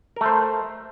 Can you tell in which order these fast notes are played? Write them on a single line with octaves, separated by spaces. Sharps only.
A#4 A3 C5